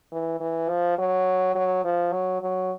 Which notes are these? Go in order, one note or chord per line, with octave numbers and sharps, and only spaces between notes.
E3
E3
F3
F#3
F#3
F3
F#3
F#3